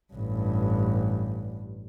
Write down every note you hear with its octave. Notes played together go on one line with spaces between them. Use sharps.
A1 G2